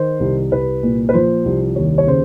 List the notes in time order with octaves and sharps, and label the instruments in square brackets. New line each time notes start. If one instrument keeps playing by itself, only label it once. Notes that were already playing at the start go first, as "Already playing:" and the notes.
Already playing: [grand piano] D#3 C5
C2
C2 B4
A#2
B4
F3 C5
C2
D#2 C#5
C#5
C#3 C5